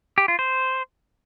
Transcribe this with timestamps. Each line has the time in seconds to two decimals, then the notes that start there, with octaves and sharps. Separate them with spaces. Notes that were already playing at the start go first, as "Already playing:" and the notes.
0.18 G4
0.28 F4
0.39 C5